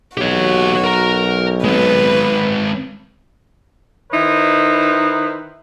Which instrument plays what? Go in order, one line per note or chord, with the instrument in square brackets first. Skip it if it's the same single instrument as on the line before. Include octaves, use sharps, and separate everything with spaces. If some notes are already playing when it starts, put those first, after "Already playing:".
[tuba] B1 [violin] F#4 [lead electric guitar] G4 C#5
[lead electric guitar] A#4 A#5
[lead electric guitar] G#3 C4 [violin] B4
[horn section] D#3 D#4 E4 B4 C5